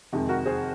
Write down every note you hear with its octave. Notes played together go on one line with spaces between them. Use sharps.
F2 C3 D#3 G#3
F#4 A#4
G#4 C5